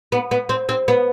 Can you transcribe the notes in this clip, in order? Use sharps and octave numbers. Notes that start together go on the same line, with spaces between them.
B3
B3
C4
C4
B3